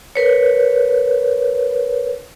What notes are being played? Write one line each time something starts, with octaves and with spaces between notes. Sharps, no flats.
A#4 B4 C#5